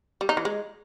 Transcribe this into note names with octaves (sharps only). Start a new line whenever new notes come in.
G3
D#4
E3
G#3